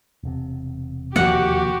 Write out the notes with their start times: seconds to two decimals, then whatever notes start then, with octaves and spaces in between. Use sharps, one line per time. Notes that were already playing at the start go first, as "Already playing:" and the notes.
0.23 E1 C3
1.16 D#2 F3 A#3 F#4 G4 F#5